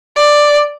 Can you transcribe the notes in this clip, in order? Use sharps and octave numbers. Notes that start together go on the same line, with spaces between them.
D5